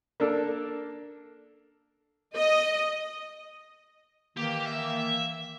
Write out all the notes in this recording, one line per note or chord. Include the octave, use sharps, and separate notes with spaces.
A#3 D4 A4
D#5
D#3 E3 A#3 G4
E5